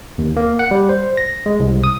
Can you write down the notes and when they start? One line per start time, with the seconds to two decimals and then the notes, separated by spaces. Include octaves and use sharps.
0.18 D#2
0.37 A#3
0.59 F#5
0.71 G3
0.89 C5
1.17 A#6
1.46 G#3
1.60 C2
1.84 D#6